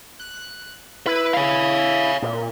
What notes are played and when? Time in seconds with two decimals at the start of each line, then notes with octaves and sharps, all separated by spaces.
0.20 F#6
1.06 E4 B4
1.33 C#5 F5
2.22 A#2